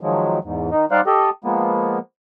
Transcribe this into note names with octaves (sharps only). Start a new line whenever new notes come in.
D#3 F3 F#3 G#3
E2 G#2
D#3 D#4
G3 D#4 C5 D5 F5 F#5
G4 A4 D#5
F3 G#3 A#3 B3